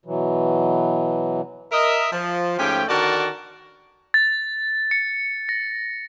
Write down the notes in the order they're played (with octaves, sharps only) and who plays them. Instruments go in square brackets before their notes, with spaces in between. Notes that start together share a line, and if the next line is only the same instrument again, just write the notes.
[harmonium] B2 E3 F#3
[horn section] A#4 D#5 E5
F3
G#2 F3 A3 C#4 G4 G5
D3 D#3 F#4 A#4 D5 A5
[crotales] A6
C#7
A#6